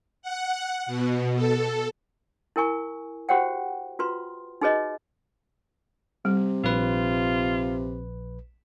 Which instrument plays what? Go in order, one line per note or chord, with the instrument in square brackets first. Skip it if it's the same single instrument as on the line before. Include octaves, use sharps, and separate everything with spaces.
[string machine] F#5
B2
A4
[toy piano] E4 A#4 G#5 C#6
F#4 G4 C5 C#5 F#5 G5
F4 F#4 B4 C6
D#4 F#4 G#4 B4 C#5 D#5
[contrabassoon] C3 [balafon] G3
[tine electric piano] A#1 B4 [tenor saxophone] F4